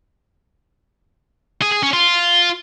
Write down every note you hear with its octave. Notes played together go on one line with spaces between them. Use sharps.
G#4
G#4
C#4
F4